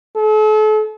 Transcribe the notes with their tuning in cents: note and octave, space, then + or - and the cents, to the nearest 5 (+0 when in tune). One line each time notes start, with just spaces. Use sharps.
A4 -40